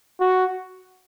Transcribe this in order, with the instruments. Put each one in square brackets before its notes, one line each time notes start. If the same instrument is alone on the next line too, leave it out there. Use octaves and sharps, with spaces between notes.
[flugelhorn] F#4